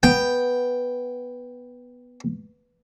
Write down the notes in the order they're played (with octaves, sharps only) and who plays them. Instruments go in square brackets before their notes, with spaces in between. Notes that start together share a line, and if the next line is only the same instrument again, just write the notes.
[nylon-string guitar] B3 [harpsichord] G5